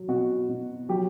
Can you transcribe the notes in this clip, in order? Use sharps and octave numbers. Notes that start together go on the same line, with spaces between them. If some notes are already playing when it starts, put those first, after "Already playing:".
Already playing: F#3
B2 F#4
B2
F#3 G4